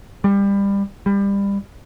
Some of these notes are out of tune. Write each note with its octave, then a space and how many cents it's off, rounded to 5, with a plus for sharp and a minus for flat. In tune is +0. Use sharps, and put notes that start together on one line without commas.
G3 +25
G3 +25